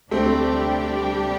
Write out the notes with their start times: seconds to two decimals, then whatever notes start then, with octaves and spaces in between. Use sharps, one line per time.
0.11 D2 C3 G3 A3 C4 D4 G4